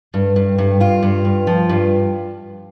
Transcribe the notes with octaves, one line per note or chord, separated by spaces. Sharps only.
G2
G2
G2
G2 F4
G2
G2
F3
G2